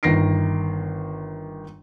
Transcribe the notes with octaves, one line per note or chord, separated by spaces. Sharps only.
G1 D#3 A#6 C7 D7